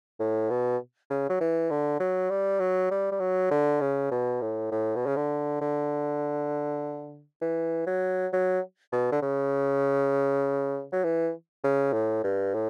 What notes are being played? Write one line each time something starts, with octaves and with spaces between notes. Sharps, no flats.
A2
B2
C#3
F#3
E3
D3
F#3
G3
F#3
G3
G3
F#3
D3
C#3
B2
A2
A2
B2
C#3
D3
D3
E3
F#3
F#3
B2
D3
C#3
F#3
E3
C#3
A2
G2
A2